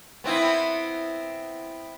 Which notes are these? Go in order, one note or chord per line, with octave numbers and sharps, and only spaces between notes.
B3 C4 E4